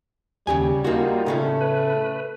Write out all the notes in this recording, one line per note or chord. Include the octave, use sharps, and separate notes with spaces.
D#2 C#3 G3 G4 G#5
A#3 D#4 F4 F#4
A2 C#3 A3 C#4
B4